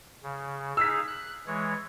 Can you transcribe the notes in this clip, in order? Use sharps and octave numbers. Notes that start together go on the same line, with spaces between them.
C#3
D#4 G#4 F5 E6 B6
F#6
E3 G#3 C#5